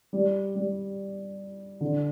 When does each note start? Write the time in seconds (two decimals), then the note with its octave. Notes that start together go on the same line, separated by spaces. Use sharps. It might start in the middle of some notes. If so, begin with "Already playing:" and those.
0.13 G3
0.55 G3
1.81 D3